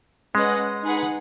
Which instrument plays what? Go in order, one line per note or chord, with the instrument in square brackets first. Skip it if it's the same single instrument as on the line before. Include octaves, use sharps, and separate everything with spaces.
[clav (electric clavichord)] G#3 [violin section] C#4 B4 D#5 F#5
[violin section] D#4 G#4 B4 F#5